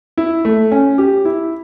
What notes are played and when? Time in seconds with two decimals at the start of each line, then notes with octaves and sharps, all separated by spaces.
0.18 E4
0.45 A3
0.71 C#4
0.98 G4
1.25 E4